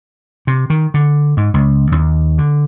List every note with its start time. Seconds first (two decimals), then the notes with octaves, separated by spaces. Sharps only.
0.47 C3
0.70 D#3
0.94 D3
1.37 G#2
1.54 C#2
1.92 D#2
2.38 D3